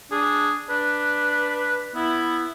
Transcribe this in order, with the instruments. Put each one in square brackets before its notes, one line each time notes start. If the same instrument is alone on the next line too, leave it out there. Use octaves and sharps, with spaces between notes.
[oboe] D4 [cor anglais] G#4
[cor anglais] D4 [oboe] B4
[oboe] B3 [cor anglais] E4